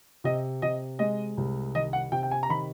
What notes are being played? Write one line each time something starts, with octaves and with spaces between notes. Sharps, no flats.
C3 D#5
C3 D#5
G#3 D#5
C2
D#3 D#5
F#5
C3 G5
G5
G#5
A#5
D#3 B5